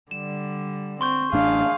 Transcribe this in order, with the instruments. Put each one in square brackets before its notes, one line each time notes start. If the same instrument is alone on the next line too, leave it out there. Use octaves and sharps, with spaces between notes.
[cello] D3 G3 [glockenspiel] E7
[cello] C4 [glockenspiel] C6 C#6 G6
[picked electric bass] A1 D4 [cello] G#4 [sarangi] F5